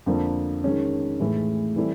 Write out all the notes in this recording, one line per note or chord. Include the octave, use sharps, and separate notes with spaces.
F2 D3 F3 A#3
D#3 G#3 C#4
A2 E3 G#3
E3 G3 C4 E4 A4